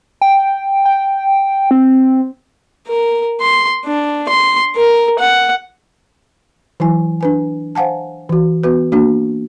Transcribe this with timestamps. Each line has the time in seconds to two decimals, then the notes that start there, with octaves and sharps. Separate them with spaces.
0.21 G5
0.85 G5
1.71 C4
2.88 A#4
3.41 C6
3.86 D4
4.29 C6
4.76 A#4
5.19 F#5
6.80 E3 F#3 E4 G#5
7.21 D4 B4 G#5
7.75 C5 F5 F#5 G#5 A5
8.29 E3 F#4
8.64 B3 F#4 B4
8.92 A#3 D4 F#4